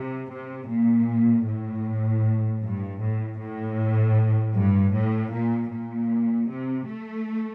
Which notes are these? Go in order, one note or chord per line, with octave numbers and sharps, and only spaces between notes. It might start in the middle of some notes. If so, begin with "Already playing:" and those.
Already playing: C3
C3
A#2
A2
G2
A2
A2
G2
A2
A#2
A#2
C3
A3